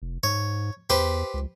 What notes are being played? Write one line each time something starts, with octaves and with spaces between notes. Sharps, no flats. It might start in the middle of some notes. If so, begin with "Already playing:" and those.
F1
G#2 C#5
E2 G4 B4 C5
C#2